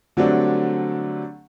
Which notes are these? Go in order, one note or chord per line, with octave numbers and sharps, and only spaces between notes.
D3 F#3 G3 A3 C4 D4